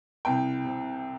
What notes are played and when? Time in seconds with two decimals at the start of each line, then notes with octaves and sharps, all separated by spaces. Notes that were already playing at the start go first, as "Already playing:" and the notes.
0.25 C2 G5
0.64 C3